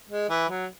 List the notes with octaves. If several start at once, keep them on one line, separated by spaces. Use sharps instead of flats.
G#3
E3
F#3